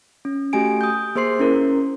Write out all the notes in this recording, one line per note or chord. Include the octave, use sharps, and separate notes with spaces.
C#4
A3 F#4 G4 G#5 D7
D#6 G6
A#3 G#4 C5 C6 C7
C#4 E4 A#4